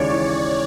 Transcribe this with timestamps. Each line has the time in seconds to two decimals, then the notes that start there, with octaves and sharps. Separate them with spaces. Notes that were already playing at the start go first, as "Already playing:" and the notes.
Already playing: D#2 C#3 E3 G#3 C#5 D5
0.11 E3